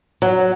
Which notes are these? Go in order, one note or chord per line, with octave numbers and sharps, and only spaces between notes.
F#3